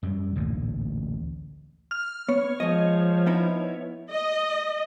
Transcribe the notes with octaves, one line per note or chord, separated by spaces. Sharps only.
F#2 G3
A1 D2 A#2
F6
B3 C#5
F3 G#3 D#5
B3 D#4 E4
D#5